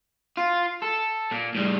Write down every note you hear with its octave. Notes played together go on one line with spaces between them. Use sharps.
F4
A4
A#2
A2 G3